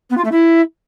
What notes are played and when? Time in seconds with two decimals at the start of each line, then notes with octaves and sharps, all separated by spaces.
0.10 B3
0.17 F4
0.24 A3
0.31 E4